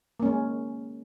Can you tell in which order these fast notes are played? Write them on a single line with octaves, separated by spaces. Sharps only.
A#3 C#4 G#3